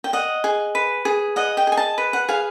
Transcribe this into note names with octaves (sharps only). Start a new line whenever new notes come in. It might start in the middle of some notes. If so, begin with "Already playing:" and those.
G5
D#5 F#5
G#4
B4
G#4
D#5 F#5
G5
G#4 G#5
A5
B4
F#5
G#4 F5